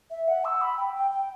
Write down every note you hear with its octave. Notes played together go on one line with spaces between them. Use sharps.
E5
F#5
E6
B5
G5
G5
G5